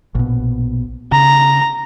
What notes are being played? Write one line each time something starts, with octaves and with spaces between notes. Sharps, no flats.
A#1 B2
C#3 A#5